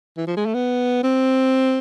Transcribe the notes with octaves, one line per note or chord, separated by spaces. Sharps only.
E3
F3
G#3
A3
B3
C4